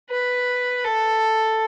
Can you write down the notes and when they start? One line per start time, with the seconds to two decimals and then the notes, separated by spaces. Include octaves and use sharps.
0.10 B4
0.85 A4